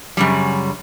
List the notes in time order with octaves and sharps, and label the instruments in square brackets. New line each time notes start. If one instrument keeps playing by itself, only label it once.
[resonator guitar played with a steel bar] F#2 C#3 G3